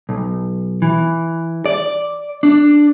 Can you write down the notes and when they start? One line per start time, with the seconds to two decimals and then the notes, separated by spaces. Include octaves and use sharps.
0.09 B1
0.82 E3
1.66 D5
2.43 D4